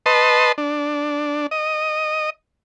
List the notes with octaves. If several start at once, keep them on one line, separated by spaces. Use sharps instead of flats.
B4 D#5 A5 C6
D4
D#5